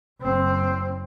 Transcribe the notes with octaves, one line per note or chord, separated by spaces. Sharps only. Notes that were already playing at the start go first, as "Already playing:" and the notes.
F#1 C4